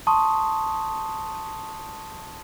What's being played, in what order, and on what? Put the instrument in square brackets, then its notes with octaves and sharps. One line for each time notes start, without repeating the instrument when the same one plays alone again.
[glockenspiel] A5 C6 C#6 D#6